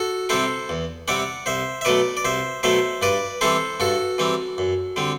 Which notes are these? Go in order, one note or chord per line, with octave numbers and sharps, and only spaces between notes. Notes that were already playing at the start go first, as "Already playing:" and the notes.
Already playing: F#4 A4
C3 G3 C4 E4 A4 C5
E2
C3 G3 C4 E4 D5 F#5
C2 C5 E5
E5
B2 F#3 A3 B4 D5
D5
C2 C5 E5
B2 F#3 A3 C5 E5
G2 B4 D5
E3 G3 C4 E4 A4 C5
G2 F#4 A4
E3 G3 C4 E4
F#2
D3 G3 C4